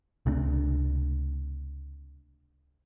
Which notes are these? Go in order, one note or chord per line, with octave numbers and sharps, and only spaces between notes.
C#2 C3 A3 D4